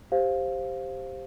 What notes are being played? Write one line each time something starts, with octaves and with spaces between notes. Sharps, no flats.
G4 C5 F5